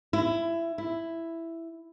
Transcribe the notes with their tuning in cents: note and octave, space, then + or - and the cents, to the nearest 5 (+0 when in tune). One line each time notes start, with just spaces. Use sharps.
E4 +20
E4 +5